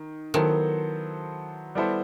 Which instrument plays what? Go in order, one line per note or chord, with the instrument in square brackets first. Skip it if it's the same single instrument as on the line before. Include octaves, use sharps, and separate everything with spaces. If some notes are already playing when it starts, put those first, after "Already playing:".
Already playing: [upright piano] D#3
[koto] D#3 [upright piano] F#3 B3 E4 A4 C5
[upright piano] G3 B3 E4 A4 C5